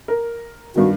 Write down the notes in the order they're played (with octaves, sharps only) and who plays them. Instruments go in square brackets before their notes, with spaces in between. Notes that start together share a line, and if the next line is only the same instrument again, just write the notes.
[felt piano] A#4
[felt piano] G2 D#3 [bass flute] F#4